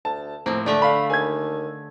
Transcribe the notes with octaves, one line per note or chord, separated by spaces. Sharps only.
D2 A5
A2 F3 A#3 C4
D3 A3 D4 E5
F5 B5
D#2 G#5 G#6